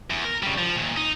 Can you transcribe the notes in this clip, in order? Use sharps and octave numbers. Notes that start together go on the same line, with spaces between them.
E2
A#4
C#3 G3
F3
A#2 D#3
D#4